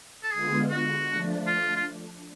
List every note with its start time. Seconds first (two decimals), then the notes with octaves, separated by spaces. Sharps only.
0.23 A4
0.32 D3 G#3 B3 F4 G#4
0.70 F#4
1.08 F3 A3 D4
1.46 F4
1.76 F4